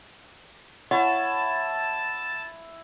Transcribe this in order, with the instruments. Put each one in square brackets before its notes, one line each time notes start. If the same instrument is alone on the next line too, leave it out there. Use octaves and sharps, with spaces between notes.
[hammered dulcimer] E4 [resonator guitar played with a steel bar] C#5 [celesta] F#5 [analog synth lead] A5